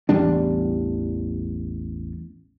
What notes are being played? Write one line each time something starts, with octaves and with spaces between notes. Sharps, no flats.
A1 E2 G3 D4